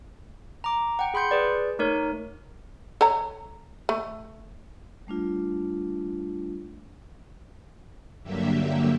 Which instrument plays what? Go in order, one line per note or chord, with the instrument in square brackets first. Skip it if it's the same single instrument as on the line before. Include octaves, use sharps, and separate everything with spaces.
[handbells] A#5 D6
F#5 G5
G#4 B5 C6 G6 C#7
G#4 B4 D5
A3 D#4 A#4 C#5
[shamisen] A4 C#5 A#5
A3
[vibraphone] G3 A3 D4 F4
[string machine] G2 D3 F#3 A#3 G4 E5